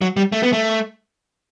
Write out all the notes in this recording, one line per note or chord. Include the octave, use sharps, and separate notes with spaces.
F#3
G3
A3
B3
A3